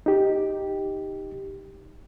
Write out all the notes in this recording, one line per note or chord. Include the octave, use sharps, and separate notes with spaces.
D#4 G4